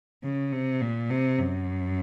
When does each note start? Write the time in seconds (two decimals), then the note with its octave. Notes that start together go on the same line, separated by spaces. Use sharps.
0.24 C#3
0.52 C3
0.81 A#2
1.10 C3
1.39 F#2